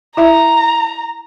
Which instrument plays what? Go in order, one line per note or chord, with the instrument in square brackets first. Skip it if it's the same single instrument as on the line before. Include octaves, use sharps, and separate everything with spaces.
[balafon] E4 E5 [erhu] A#5